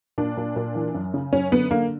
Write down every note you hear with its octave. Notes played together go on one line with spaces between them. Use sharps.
A#2 D4
A#2
A#2
E3
F#2
C#3
F#2 C#4
D3 B3
D3 A#3